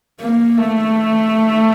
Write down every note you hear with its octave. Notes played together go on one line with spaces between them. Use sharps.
A#3
A3